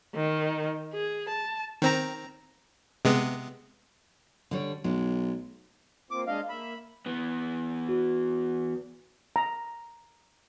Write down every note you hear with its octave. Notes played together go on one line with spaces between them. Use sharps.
D#3
G#4
A5
D#3 C4 A#5
C3 G#3 B3
D3 G3 C#5
B1 G#3
A#3 C4 F4 D6
G#3 D4 D#5 F5
A#3 E5 B5
E3 B3
F#4
A#5